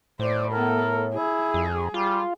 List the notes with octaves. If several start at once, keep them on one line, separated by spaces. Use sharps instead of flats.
A2 C5 D5
B3 A4 A#4
E4 G#4
F2
G3 F4